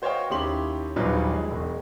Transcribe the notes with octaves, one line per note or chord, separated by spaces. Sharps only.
F#4 C5 C#5 D#5 F5 G5
D#2 C#4 E4 G4 C6 F#7
A#1 D#2 F#3 G3 F4 B4
G#3
E1